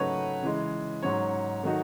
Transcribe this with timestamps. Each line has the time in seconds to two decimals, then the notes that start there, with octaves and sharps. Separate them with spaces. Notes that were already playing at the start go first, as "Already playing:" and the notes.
Already playing: C#3 F#3 A3 D#4 F#4 B4 C#5
0.43 C#3 E3 G#3
1.02 G#2 F#3 C#4 C#5
1.63 D#3 F#3 A3 D#4 F#4